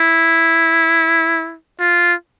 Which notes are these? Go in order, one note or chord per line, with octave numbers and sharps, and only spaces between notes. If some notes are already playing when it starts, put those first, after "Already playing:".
Already playing: E4
F4